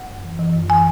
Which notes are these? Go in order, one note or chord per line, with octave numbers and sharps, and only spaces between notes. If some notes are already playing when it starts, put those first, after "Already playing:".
Already playing: F#5
F#2
E3
E3
F#2
E3 G#5